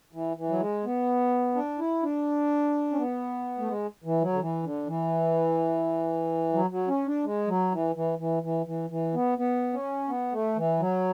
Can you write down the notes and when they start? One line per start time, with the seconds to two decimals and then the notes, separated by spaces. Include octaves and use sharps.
0.13 E3
0.37 E3
0.49 F#3
0.60 G#3
0.85 B3
1.55 D4
1.79 E4
2.03 D4
2.92 C#4
2.98 B3
3.59 A3
3.68 G#3
4.04 E3
4.21 F#3
4.33 D3
4.40 E3
4.63 D3
4.87 E3
6.53 F#3
6.70 F#3
6.88 C#4
7.06 D4
7.24 G#3
7.48 F#3
7.72 E3
7.96 E3
8.19 E3
8.43 E3
8.66 E3
8.90 E3
9.14 B3
9.38 B3
9.73 C#4
10.09 B3
10.32 A3
10.56 E3
10.80 F#3